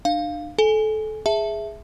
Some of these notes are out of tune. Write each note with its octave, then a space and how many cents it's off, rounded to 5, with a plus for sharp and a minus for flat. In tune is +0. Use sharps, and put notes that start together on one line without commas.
D4 +40 F5 +0
A4 -25 G#5 +0
G#4 +0 E5 +0 A5 +0